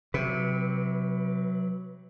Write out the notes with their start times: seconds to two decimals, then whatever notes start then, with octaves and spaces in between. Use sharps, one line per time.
0.14 C3 F#3 B4